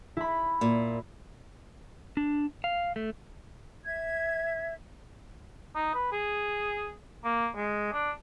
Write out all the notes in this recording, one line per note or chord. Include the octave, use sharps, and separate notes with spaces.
E4 B5
A#2
D4
F5
A3
E5 G#6
D#4
B4
G#4
A#3
G#3
D4